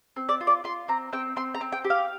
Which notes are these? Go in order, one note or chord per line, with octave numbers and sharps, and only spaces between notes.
C4
D5
F4
D5
F4 C6
C4 A#5
C4 G5
C4 C6
A#5
C4
G5
G4
F5